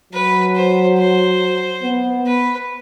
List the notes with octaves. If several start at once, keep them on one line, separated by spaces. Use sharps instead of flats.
F#3 B4
C5
C5
B3
B4